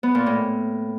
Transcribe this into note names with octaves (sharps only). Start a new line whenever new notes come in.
B3
A#2
A2